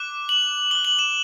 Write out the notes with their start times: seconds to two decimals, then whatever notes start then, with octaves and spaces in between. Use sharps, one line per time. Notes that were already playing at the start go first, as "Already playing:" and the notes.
Already playing: D6 F#6
0.29 F#7
0.71 D6 F#6 G7
0.85 F#7
0.99 E7